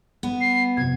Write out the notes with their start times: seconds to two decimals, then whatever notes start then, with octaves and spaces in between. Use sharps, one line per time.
0.23 G3 B3
0.41 C7
0.77 F2 C3 G#6